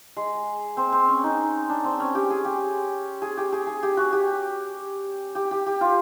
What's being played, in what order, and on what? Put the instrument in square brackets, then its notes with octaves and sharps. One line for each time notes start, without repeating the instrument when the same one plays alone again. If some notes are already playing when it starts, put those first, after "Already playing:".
[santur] G#3
C4
C4
C#4
D#4
D4
C4
C#4
G4
G#4
G4
G#4
G4
G#4
G#4
G4
F#4
G4
G4
G4
G4
F4